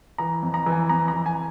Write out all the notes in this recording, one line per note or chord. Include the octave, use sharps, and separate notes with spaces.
E3 A#5
F2
A#5
E3
G#5
F2 A#5
A#5
E3
G#5